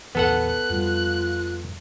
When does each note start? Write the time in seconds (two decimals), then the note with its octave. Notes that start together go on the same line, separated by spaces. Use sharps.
0.15 A#1 E2 E3 B3 A4 F#5 F#6
0.70 F2 G3 F4